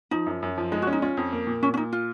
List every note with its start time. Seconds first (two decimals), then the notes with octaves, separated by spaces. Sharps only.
0.11 F3 D#4
0.27 F#2
0.43 F#2
0.58 F3
0.72 G#3 D#4
0.82 F#4
0.87 C#4
0.93 D#4
1.02 C#4 F4
1.17 F2
1.32 A#3
1.47 A#2
1.62 A#2 C#4
1.74 C#4
1.77 A#2 D#4
1.93 F4